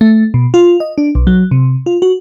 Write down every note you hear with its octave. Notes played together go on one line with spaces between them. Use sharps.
A3
B2
F4
D#5
D4
B1
F#3
C3
F4
F#4